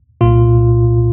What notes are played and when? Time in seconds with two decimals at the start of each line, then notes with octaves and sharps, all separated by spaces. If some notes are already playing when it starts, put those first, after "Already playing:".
0.21 C2 A#2 F4